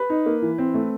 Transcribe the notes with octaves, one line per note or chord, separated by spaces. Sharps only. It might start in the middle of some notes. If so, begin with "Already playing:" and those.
Already playing: B4
D#4
A#3
E3
C4
A3